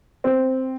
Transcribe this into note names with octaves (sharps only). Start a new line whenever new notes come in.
C4